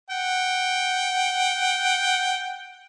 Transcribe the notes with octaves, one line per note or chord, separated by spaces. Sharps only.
F#5 G5